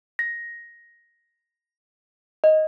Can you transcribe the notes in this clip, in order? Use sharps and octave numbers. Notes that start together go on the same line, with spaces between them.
A#6
D#5